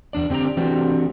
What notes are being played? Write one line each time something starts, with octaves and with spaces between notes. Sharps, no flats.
E2 D4 D5
D3 C4 G4 D5 A#5
E3 A3 C4 D4 F#4 G4